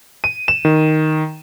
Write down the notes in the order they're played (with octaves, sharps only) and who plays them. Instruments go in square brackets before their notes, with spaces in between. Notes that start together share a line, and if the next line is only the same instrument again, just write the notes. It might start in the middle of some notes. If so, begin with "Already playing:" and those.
[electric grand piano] D#7
E7
D#3